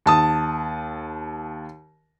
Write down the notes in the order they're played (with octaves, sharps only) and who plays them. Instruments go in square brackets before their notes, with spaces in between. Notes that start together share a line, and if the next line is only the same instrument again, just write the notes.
[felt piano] D#2 A5 D#6